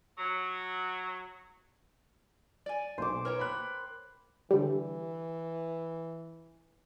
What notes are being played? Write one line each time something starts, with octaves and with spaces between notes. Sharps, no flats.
F#3
D5 G#5
B1 C5 D6
A#4 B4 C#5 G5
B5 F#6
D3 E3 G3